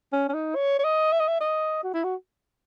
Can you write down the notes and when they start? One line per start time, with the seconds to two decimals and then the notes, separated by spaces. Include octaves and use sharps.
0.12 C#4
0.29 C#4
0.34 D#4
0.56 C#5
0.79 C#5
0.84 D#5
1.12 E5
1.20 D#5
1.28 E5
1.40 D#5
1.83 F#4
1.94 E4
2.04 F#4